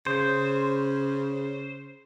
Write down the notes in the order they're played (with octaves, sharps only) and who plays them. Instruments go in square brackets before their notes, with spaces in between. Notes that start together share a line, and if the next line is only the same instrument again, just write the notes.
[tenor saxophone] C#3 [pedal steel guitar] C5